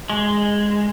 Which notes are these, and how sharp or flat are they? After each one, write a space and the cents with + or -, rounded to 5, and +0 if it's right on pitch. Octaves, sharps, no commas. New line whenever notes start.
G#3 -5